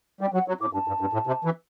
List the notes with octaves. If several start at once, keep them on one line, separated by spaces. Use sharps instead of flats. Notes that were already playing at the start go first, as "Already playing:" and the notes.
G3 G5
F#3 F#5
F#3
A2 D6
G2 A5
G2
G2
A2
C3
E3